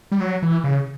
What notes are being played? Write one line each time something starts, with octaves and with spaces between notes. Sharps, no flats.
G3
F#3
E3
C#3